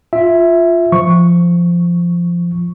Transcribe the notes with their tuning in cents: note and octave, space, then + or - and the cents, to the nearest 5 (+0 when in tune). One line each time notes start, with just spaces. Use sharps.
F4 +0 E5 +0
F3 -15 C#6 +0